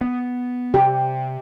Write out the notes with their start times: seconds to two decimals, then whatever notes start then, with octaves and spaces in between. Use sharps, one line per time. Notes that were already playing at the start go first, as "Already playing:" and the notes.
0.01 B3
0.74 C3 G4